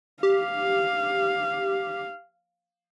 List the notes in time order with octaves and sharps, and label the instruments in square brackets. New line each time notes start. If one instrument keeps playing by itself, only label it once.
[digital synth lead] G4 [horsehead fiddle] F5